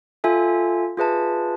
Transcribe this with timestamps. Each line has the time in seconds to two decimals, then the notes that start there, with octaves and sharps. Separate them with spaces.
0.24 F4 A4 E5 G#5
0.97 F4 G#4 B4 E5 A5